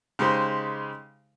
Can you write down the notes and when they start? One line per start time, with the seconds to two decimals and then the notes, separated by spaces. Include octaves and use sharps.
0.19 C#3 G#3 D#4 G4 C5